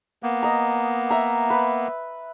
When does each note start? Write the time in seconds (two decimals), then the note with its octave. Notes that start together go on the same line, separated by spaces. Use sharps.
0.23 A#3 B3
0.43 D#5 A#5
1.10 E5 A#5
1.50 B4